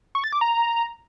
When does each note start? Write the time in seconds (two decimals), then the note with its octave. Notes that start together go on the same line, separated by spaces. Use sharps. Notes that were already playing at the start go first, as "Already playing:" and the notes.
0.15 C#6
0.24 A6
0.32 D6
0.41 A#5